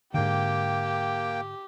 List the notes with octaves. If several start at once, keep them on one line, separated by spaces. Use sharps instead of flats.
G#2 D3 A#3 G4 G5